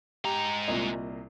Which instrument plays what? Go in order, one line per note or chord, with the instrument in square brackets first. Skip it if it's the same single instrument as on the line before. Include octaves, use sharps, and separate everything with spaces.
[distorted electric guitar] G#3 A#5 [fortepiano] G4
[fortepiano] C2 A#2 D#5